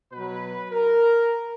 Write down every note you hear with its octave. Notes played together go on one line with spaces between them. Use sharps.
B2 F#3 B4
A#4